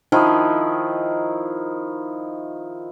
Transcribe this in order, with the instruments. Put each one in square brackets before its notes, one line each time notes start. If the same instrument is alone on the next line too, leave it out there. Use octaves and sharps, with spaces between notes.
[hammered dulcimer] D#3 F3 E4